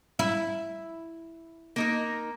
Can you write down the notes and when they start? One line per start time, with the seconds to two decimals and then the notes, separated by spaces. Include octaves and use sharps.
0.19 E4
1.76 A#3 D#4 A#4